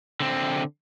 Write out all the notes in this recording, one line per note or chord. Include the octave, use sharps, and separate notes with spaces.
D3 C4